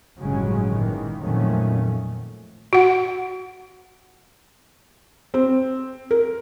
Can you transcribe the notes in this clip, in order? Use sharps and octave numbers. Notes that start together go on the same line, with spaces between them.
G1 A2 C#3 F#3 G#3 C#4
A#2 D#3 E3
F2 A#2 D#3 F#3 A3 C#4
F#4 F#5
C4
A#4